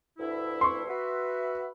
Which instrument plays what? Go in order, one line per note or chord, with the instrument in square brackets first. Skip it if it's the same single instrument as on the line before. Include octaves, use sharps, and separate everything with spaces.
[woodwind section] D2 G2 E4
[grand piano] C6 C#6
[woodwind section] F#4 B4 E5